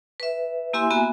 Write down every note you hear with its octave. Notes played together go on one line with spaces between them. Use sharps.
B4 E5
A#3 E4 G4 E5 G#5 C6
A#3 B3 F#4 E5 G#5 A#5